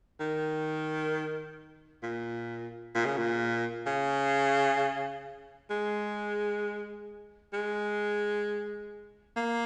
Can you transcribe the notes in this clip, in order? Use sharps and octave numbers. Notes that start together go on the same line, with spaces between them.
D#3
A#2
A#2
C#3
A#2
C#3
G#3
G#3
A#3